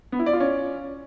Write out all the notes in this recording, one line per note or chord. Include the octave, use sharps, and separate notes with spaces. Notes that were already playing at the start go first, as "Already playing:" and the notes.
B3
E4
D5
F4
C#4